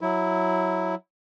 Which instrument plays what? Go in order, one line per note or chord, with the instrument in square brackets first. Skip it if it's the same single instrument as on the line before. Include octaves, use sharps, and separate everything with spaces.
[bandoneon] F#3 E4